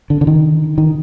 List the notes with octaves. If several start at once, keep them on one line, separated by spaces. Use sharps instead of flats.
D3
D3
D#3
D#3